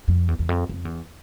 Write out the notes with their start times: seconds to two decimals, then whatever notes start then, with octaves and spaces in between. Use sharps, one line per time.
0.08 F2
0.28 E2
0.39 E2
0.49 F2
0.69 F2
0.85 E2